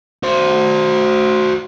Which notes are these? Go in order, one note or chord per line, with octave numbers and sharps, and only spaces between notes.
F#4 C5